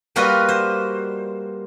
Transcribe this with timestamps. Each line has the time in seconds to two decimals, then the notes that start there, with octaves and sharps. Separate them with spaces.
0.16 G3 A#3 F4 F#4 B4 D#5
0.49 C5